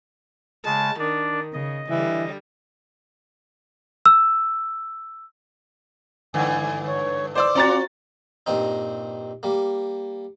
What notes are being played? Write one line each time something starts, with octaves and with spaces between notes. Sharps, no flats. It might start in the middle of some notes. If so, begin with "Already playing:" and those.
C#3 G#3 A5
D#3 D4 D5
C#3 D#5
D3 E3 G3
E6
G2 D3 E3 G#5
C#5
C5 D5 D6 E6
C4 F4 F#4 D5 A#5 A6
G2 A#2 C4 D#4
G3 A#3